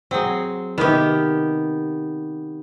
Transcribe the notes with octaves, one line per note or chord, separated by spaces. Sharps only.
F#3 C4 G#4
C3 D#3 B3 G4